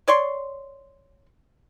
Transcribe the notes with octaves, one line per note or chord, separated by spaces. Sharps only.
C#5 D5 C6 C#6